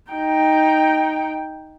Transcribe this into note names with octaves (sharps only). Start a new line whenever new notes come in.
D#4 G5